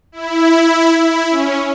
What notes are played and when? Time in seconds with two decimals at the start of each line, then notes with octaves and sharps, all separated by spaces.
0.12 E4
1.00 E4
1.29 C#4